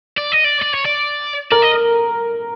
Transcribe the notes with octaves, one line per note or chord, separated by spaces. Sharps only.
D5
D#5
D5
D5
C#5
D5
A#4 D5
D#5